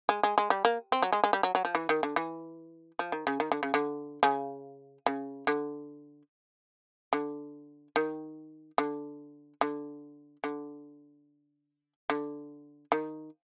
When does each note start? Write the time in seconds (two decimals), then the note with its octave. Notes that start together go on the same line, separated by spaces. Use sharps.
0.09 G#3
0.23 G#3
0.38 G#3
0.50 G3
0.65 A#3
0.92 C4
1.02 F#3
1.12 G#3
1.24 G#3
1.33 G3
1.43 F#3
1.55 F#3
1.65 F3
1.75 E3
1.89 D#3
2.03 D3
2.16 E3
2.99 F3
3.12 D#3
3.27 C#3
3.40 D#3
3.52 D3
3.63 C#3
3.74 D3
4.23 C#3
5.06 C#3
5.47 D3
7.13 D3
7.96 D#3
8.78 D3
9.61 D3
10.44 D3
12.10 D3
12.92 D#3